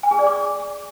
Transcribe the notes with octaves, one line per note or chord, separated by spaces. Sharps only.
G#5
G#4
D5
D6